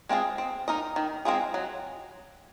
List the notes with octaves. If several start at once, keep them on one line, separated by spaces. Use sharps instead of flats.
G#3 C4 F4 G#4
C4
D#4 A#4 D#5
D#3
G#3 C4 F4 G#4
F#3